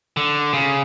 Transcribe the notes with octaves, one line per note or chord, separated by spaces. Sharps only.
D3
C#3